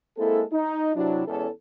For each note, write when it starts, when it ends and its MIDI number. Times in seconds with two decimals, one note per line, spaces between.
0.18 0.42 56
0.18 0.42 58
0.18 0.42 60
0.18 0.42 64
0.18 0.42 69
0.52 0.93 63
0.95 1.26 48
0.95 1.26 54
0.95 1.26 62
0.95 1.26 64
1.27 1.47 40
1.27 1.47 56
1.27 1.47 61
1.27 1.47 69